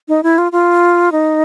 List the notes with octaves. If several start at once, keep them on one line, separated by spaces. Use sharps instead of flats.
D#4
E4
F4
F4
D#4